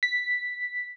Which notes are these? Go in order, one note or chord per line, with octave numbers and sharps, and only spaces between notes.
B6